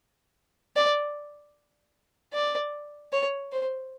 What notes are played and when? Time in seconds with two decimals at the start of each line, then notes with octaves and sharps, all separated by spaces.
0.76 D5
2.33 D5
3.13 C#5
3.52 C5